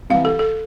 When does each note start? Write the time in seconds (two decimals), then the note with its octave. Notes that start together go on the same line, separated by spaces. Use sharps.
0.10 C2 C3 E3 F5
0.25 A4
0.39 A4